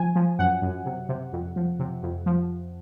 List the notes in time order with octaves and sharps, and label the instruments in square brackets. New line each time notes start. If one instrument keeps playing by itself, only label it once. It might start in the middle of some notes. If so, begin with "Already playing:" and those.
Already playing: [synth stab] F3 G#5
F3
F#2 F#5
F#2
C3
C3
F2
F3
C3
F2
F3